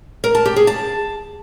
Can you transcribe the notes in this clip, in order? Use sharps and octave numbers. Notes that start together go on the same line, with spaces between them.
A#4
A5
G4
G#4
A5